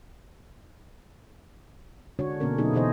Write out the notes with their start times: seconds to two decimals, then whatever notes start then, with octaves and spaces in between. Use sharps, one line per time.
2.19 D3 G#3 D4 F#4 C#5
2.40 B2 D3 A#3 B3 C#4 A#4
2.58 B2 F#3 B3 D#4 E4 G#4
2.73 B2 E3 D#4 G#4 C5 D#5